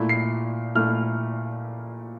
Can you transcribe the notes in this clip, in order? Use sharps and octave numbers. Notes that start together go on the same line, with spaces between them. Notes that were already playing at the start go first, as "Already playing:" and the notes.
Already playing: A#2 A3 E4
C7
A#2 A3 E4 F6